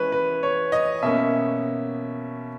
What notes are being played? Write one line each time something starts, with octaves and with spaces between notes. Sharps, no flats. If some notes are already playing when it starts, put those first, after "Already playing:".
Already playing: E3 G#3 C#4 B4 C#5
B4
C#5
D#5
B2 A#3 C#4 E5